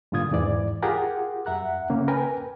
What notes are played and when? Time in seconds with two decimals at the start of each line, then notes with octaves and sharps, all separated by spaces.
0.12 G2 A#2 D3 F4 D#6 G#6
0.31 E2 G#2 E3 D5
0.83 F4 G4 G#4 A#4 F#5
1.46 F#2 E5 F#5 A#5 F#6
1.90 C#3 A#3 C#4
2.08 A#4 B4 G5 G#5